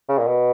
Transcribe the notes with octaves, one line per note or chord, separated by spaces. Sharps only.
C#3
A#2
B2